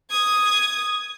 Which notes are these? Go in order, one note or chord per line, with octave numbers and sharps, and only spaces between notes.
D#6 G#6